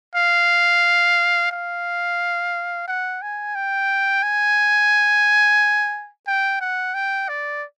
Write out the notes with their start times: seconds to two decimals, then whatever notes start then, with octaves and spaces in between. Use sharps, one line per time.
0.16 F5
1.51 F5
2.88 F#5
3.22 G#5
3.55 G5
4.23 G#5
6.27 G5
6.61 F#5
6.94 G5
7.29 D5